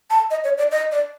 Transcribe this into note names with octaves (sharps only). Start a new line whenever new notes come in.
A5
D#5
C#5
D5
D#5
D5